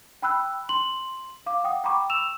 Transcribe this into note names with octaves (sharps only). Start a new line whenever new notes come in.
G5 B5 E6 F#6
C6 F#7
F5 D6
F#5 G5 D#6
G5 A#5 B5 C#6 D6
E6 E7 F7